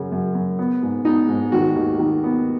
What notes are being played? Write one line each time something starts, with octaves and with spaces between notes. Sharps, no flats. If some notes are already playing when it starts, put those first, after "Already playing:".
Already playing: F#2 C#3
F#2
F#2
B3
G#2
B3 D#4
G#2
D#3 F#4
D#2
D#3
B3